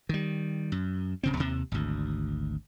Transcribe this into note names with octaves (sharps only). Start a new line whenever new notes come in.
D#3 G3
F#2
D1 C#3 C4
D#2 C3
G#1 D2